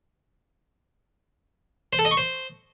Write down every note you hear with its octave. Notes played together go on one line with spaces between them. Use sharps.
C5
A4
D#5
C#6
C5